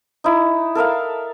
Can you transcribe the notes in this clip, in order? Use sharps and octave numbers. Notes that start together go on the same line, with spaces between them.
D#4 E4
A4 A#4 E5 F5